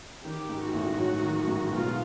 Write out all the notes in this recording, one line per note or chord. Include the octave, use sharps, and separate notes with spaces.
D#3 G4
G#2
F#4
A1
F#3
D#3
G#2
B2 F4